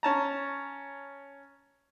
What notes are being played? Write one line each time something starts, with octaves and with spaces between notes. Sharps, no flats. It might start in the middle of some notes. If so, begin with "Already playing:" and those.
C#4 A5 A#5